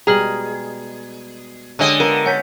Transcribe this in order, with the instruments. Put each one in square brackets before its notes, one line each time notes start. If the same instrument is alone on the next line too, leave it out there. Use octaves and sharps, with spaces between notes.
[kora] B2 G3 G#3 [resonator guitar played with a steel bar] G#4 [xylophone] A#5 F6 F#7
[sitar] D3 D#5 [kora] G#3 C#4 G4
[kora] B3 F4 D5 [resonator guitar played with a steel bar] A#4
[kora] C#4 [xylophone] F#5 G6 B6